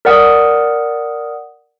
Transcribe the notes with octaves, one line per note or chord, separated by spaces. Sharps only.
A#4 D5 F#5 D#6